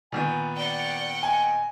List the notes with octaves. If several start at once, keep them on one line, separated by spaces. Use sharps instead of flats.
A#2 D#3 B3 G#5
D5 F#5 G5
D#5 G#5